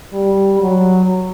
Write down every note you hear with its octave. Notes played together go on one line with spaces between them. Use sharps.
G3
F#3